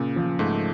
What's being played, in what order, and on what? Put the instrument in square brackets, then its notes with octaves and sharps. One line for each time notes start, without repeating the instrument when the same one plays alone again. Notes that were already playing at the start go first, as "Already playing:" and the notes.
Already playing: [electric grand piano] A#2 [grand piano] C#3
[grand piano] F3
[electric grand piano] G#2 [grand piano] A3